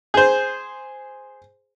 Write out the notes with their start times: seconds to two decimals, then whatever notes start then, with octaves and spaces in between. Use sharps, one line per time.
0.14 G#4 C5